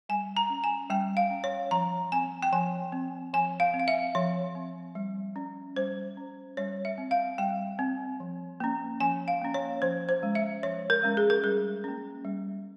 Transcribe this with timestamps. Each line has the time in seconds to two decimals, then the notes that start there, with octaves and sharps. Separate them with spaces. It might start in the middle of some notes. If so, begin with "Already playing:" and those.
0.09 G3 G#5
0.37 A#5
0.50 C#4
0.64 G#5
0.90 G3 G5
1.17 F5
1.30 C#4
1.44 C#5
1.71 F3 A#5
2.12 C4 G#5
2.43 G5
2.53 F3 G#5
2.92 C4
3.33 F3 G#5
3.60 F5
3.74 C4
3.80 F5
3.88 E5
4.15 F3 C#5
4.55 C4
4.95 G3
5.36 C#4
5.76 G3 C5
6.17 C#4
6.57 G3 C#5
6.85 E5
6.98 C4
7.11 F5
7.38 G3 G5
7.79 C4
8.20 F3
8.60 A#3 C#4
9.00 F3 G#5
9.28 F5
9.42 A#3 C#4
9.54 C#5
9.82 F3 C5
10.09 C5
10.22 G#3 C#4
10.35 E5
10.63 F3 C#5
10.90 A#4
11.03 G#3 C#4
11.17 G#4
11.30 A#4
11.44 G3 G#4
11.84 A#3 C#4
12.25 G3